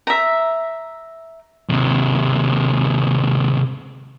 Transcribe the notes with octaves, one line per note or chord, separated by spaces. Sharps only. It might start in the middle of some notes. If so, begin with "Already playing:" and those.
E5 A#5
D#2 C3